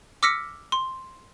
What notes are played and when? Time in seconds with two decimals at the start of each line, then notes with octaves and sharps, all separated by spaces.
0.23 D6 E6 F6 A#6 B6 C#7
0.72 C6